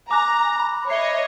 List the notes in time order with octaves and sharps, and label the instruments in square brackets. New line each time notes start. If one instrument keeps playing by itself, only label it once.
[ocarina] G#5 [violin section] A#5 [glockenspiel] D6 F#6
[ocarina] B5
[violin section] C#5 D#5 [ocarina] E5 [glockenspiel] C7 G7